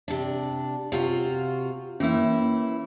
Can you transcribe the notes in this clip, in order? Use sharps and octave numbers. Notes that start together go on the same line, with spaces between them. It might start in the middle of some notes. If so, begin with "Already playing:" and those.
C3 D4
C3 F4 F#4
E3 A#3 C#4 E4